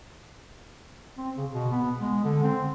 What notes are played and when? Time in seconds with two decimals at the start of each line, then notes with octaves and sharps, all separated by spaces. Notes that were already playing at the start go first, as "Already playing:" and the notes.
1.18 C4
1.37 C#3
1.52 B2
1.71 B3
2.00 G#3
2.24 D3
2.44 C4